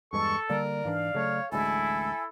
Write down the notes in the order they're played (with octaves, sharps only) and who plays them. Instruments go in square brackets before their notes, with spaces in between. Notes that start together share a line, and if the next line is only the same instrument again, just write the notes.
[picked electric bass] E2 G2 G#3 [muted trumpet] A4 [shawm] C#6
[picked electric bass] D3 G3 A#3 [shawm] A#4 [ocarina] D5
[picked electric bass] G#2 E3 D4 [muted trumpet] F5
[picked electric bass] C#3 F#3 A3 [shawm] C#5
[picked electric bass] A1 D2 G#3 [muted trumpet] E4 [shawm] A4 [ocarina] G#5